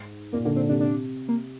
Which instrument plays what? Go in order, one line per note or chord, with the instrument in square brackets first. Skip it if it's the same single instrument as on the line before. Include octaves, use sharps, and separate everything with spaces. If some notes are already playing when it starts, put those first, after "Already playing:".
Already playing: [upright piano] G#2
[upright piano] A#2 [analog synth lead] A#3
[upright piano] D3 [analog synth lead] A#3
[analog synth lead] C4
[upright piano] C3 [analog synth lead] D4
[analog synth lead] D4
A#3